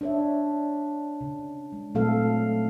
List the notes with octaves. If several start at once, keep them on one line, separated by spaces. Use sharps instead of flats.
D4 C#5 E5
C#3
G#3
A#2 F#3 A3 C4 A4 F5